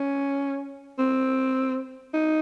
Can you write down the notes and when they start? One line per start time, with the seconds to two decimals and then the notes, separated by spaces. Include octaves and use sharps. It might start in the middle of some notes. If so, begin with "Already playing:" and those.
Already playing: C#4
0.99 C4
2.14 D#4